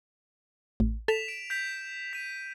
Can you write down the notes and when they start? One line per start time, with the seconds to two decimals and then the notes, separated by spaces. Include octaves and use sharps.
0.80 A1
1.08 A4 B6 E7 F7
1.28 D7
1.50 G6 B6 F7
2.13 B6 D#7